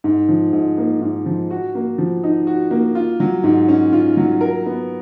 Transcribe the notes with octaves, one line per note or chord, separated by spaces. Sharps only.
G#2
F3
G#2
A#3
G#2
F3
F#4
A#3
F3
D#4
F#4
A#3
F4
F#3
G#2
C#4
F4
F#3
A#4
B3